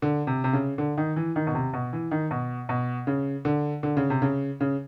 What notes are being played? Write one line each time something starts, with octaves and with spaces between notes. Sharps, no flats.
D3
C3
C3
C#3
D3
D#3
E3
D#3
B2
C3
B2
E3
D#3
B2
B2
C#3
D3
D3
C#3
C3
C#3
C#3